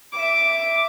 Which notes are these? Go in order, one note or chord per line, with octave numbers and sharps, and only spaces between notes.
E5 D6